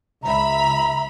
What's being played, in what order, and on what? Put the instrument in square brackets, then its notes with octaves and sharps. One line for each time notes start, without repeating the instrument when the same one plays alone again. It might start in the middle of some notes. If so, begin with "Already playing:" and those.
[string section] C#2 E5 B5 [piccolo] A#5